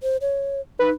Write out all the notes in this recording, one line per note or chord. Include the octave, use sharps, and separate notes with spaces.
C5
C#5
D#4 B4